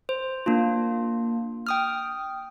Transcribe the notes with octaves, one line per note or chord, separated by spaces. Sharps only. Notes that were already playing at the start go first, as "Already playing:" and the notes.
C5
A#3 D4 F4
G5 D#6 F6